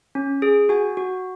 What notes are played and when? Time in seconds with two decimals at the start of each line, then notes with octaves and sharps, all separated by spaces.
0.15 C#4
0.42 G#4
0.69 F#4 G#5
0.97 F#4